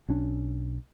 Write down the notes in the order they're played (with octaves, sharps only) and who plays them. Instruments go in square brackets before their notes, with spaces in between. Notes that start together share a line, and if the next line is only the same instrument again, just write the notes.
[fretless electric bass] B1 C#4 D4